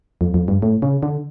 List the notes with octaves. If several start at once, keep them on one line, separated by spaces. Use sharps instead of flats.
F2
F2
G2
A2
C#3
D3